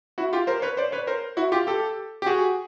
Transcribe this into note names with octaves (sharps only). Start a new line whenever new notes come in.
E4 F#4
F4 G4
A#4 C5
B4 C#5
C5 D5
B4 C#5
A#4 C5
E4 F#4
F4 G4
G4 A4
G4
F#4 G#4